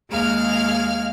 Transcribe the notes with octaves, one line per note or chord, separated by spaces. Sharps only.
D#2 G#3 G#4 F5 F6